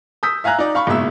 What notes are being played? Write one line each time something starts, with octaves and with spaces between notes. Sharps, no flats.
D#6 E6 G6 B6
E5 F5 G#5 A#5 F#6
D#4 D5
F5 B5 C#6
F#1 G#2 B2 E5 E6